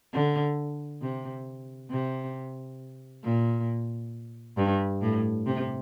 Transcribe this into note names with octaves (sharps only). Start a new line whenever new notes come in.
D3
C3
C3
A#2
G2
A2
C3